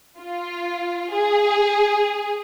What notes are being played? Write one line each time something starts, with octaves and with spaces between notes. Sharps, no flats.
F4
G#4